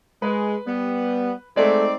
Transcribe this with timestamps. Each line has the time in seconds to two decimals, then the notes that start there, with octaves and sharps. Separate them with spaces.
0.22 G#3 B4
0.66 G3 B3
1.56 G#3 A3 C4 D#4 D5